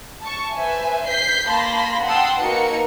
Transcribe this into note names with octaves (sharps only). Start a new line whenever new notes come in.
A5 C#6
B4 C5 E5 G#5
G6 B6 C7
A#3 A5 B5 C6 A#6
F#5 G5 A5 C6 D#6 E6
A#3 D#4 F#4 A#4 B4 C#7